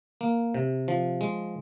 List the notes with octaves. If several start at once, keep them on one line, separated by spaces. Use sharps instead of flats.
A#3
C3
F3
G#3